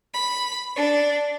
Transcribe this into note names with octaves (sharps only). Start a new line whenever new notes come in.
B5
D4